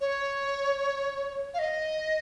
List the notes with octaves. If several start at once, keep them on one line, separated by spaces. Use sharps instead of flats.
C#5
F5
D#5